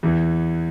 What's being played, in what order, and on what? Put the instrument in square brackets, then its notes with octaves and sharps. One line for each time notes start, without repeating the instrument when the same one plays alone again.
[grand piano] E2 E3 B3